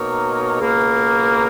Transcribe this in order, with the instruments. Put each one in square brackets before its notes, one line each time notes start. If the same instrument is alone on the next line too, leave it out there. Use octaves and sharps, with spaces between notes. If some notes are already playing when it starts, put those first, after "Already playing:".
Already playing: [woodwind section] B2 A#3 D#4 A#4 C#5
C#2 B2 A#3